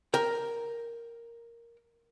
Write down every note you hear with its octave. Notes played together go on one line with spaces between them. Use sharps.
A#4 G5